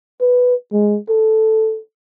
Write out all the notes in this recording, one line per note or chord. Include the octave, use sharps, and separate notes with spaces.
B4
G#3
A4